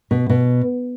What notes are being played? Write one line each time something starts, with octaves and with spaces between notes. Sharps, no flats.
B2
B2